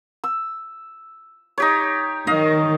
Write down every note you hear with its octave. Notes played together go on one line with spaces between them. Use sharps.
E6
D#4 G4 C#5
D#3 D#5 F5